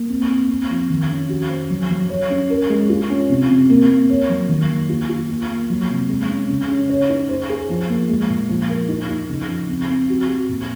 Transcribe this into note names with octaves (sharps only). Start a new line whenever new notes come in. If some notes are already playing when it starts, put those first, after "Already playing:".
Already playing: A#3
C4
C4
C4
F3
D#3
C#4
F#4
C5
F#3
F#3
C#5
C#4
A#4
G#3
F4
C#4
C3
C3
A#3
A#3
C#5
F#3
D#3
A#3
F4
F4
A#3
A#3
F#3
C3
G#3
C#4
C#3
C#4
C#5
D#4
C5
G#4
F3
A#3
G#3
A#2
F3
A#4
D#4
D#4
C#3
F3
C4
C4
F#4
F#4
A#2